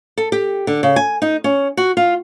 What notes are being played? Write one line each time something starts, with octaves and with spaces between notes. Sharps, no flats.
A4
G4
D3
C#3
G#5
D#4
C#4
F#4
F4